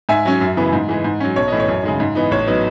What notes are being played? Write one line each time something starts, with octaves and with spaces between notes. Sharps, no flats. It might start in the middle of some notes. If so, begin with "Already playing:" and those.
G#2 E5 G#5
F#3 C#4
F#2
C#3 E3 B3
G#2
E3 G#3
G#2
F#3 C#4
B1 C#5
A2 E3 D#5
C#5
F#2
C#3 G#3 D#4
G#2
E3 B3 D#4
A1 C#5
F#3 B3 D#4